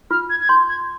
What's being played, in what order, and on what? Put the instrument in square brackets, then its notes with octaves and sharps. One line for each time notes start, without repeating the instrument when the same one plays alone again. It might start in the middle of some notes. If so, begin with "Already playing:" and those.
[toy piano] F4 [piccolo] F6
[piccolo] G#6
G#6
[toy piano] C6 [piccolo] G6
[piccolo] G#6